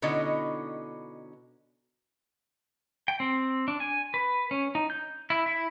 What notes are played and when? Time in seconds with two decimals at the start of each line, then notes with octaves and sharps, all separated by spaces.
0.02 B2 D3 C#4 D#4 E4 D#5
3.08 G5
3.20 C4
3.68 D4
3.80 G#5
4.14 B4
4.51 C#4
4.75 D#4
4.90 G6
5.30 E4
5.46 E4